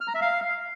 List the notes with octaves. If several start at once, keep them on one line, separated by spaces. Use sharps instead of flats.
F6
A#5
E5
F5